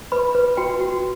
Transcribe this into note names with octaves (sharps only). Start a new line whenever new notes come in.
B4 B5
B4
F#4 G5
F#4